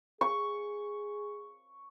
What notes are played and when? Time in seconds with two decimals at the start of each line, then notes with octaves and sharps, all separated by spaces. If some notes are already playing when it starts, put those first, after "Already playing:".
0.21 G#4 C#6